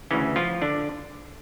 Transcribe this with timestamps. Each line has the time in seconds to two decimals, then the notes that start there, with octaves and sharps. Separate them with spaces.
0.11 D2 C#3 E3 C#4
0.36 F3 F4
0.62 D3 D4